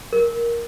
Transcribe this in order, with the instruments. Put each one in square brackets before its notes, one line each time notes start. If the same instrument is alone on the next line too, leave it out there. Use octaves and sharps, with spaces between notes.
[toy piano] A#4